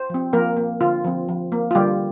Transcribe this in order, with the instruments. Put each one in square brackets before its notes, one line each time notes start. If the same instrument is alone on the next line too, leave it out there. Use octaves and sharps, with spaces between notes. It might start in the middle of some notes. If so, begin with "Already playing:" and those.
Already playing: [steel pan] C5
F3 C4
F3 A#3 A#4
A#3
D3 F4
F3 C4
F3
A#3
F4
D3 G3 G4